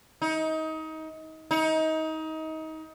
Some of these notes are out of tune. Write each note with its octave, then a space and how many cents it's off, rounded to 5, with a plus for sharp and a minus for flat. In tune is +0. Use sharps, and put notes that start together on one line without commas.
D#4 +25
D#4 +25